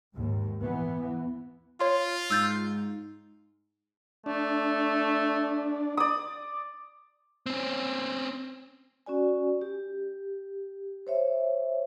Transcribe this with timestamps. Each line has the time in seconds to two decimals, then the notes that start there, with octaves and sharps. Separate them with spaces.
0.15 D#2 G#2
0.60 E3 B3
1.81 F4 C#5 C6
2.30 G#2 E6 G6 A6
4.26 A3 D4
5.97 D5 D#6
7.46 C4 C#4
9.06 C#4 F#4 D5 G#5
9.61 G4
11.07 C5 C#5 E5